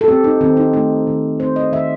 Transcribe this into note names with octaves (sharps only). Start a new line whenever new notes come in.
A4
C4 G4
D#4
D#3 C4
D#4
A3 D#4
D#3
C4 C5
D#5
D#3 E5